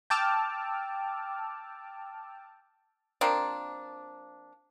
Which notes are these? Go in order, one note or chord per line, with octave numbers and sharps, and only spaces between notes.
G5 A5 D6 E6 F6
F3 A#3 C4 D4